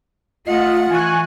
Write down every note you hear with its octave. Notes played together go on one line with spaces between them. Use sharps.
A3 F4 D#5 F#5
E3 G#5 C#6 F#6